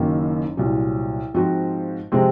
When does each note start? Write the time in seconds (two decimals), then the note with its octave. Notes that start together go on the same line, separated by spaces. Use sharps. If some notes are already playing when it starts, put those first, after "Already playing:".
Already playing: F#1 F#2 D#3 A#3
0.57 C2 A#2 F#3
1.34 G#2 F3 C4 F#4
2.12 C3 F3 G#3 C4